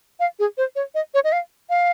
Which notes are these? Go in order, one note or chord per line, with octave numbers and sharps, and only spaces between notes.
F5
G#4
C5
C#5
D#5
C#5
D#5
F5
F5